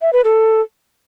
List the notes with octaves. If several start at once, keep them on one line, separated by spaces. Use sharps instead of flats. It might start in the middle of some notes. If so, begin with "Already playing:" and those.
E5
B4
A4